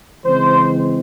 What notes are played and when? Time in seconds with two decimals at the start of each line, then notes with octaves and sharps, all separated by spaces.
0.24 C#3 E3 G#3 C4 C5